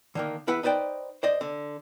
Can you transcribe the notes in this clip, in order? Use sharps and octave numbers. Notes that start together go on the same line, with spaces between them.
D3 D#3 A#3
E2 E4 B4 F#5
D#4 B4 C5 D5 G5
C5 D5 D#5
D3